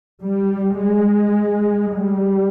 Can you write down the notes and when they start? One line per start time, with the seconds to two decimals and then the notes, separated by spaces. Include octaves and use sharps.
0.22 G3
0.80 G#3
1.95 G3